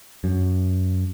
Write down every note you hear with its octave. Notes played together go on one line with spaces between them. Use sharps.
F#2